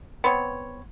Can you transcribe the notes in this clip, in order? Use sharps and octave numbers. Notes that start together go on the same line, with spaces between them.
B3 C4 C#5